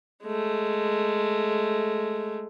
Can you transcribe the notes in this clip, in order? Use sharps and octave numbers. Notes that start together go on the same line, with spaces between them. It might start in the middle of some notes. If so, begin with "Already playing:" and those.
G#3 A3